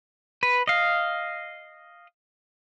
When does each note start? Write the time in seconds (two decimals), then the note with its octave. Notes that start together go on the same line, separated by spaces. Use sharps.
0.43 B4
0.68 D#5 F5